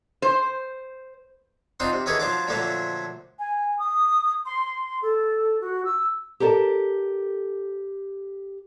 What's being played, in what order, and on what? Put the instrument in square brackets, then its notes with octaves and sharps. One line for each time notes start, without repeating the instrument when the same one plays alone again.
[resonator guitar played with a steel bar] C5
[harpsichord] C4 D4 D#4 F4 F#4
C3
D#3 E3 C#4 F#4 G#4 A4
F3 F#3 D4 F4 D6
A#2 D3 F3 F#3 A3 D4
[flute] G#5
D#6
C6
A4
F#4
E6
[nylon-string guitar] G4 A4 A#4 D5 A5